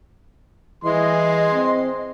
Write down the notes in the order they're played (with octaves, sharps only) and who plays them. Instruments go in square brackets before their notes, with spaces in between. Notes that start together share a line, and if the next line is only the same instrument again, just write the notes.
[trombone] E3 [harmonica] G#4 C6 [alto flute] D#5
[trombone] C4